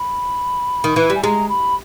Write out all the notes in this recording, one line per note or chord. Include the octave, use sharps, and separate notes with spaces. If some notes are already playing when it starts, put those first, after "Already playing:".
Already playing: B5
D#3
E3
G3
G#5
G#3 A#5
B5